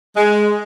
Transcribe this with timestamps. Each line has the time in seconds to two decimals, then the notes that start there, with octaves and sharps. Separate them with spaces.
0.16 G#3